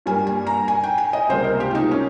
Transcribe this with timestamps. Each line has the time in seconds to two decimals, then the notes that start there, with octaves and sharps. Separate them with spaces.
0.06 G2 G3 A#3 G#5
0.27 G#5
0.47 A#5
0.68 G#5
0.83 G5
0.98 G#5
1.13 D#5
1.29 C#2 C3 G3 A#3 C5
1.44 A#4
1.60 G4
1.71 F4
1.75 D#4
1.91 C#4